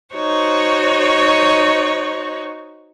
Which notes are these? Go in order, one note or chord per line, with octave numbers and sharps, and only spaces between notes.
D#4 F#4 C5 C#5